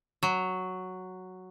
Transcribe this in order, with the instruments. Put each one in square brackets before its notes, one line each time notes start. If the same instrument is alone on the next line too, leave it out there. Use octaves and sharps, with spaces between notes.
[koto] F#3